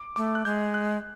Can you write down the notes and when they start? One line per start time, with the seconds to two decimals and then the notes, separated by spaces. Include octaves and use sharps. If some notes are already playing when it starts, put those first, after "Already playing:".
Already playing: D6
0.16 A3 D6
0.35 F#6
0.45 G#3 G6
0.74 F#6